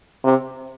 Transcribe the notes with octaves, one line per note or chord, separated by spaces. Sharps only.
C3